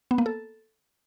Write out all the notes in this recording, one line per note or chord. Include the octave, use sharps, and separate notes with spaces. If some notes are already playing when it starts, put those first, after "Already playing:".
B3
A#3
A4